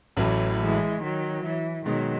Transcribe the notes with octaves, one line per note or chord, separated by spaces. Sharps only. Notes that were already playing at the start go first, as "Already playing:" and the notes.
A1 A2 E3 F#3
E3 G#3
D#3 F#3
E3
B2 D#3 F#3 G#3 D#4